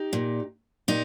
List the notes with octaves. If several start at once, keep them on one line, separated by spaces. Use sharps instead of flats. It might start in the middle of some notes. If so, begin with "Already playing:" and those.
Already playing: D#4 G4
A#2
A#2 D#4 G4